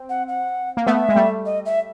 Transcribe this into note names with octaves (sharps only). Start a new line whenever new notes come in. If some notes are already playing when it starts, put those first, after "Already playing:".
Already playing: C4
F#5
F#5
A#3
A3 B3 E5 F#5
G#3
G3 A3
D#5
E5